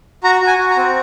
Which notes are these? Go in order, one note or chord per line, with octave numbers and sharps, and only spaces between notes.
F#4 A#5
F#4
G#5
F#4
A#5
C4